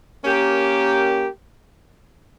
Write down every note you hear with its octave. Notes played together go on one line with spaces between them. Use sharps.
A#3 C#4 G4 A#4